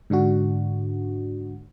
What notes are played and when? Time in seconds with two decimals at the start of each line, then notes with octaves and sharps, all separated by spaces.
0.10 G#2 D3 D4 F#4